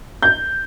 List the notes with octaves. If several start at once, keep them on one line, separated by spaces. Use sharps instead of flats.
G6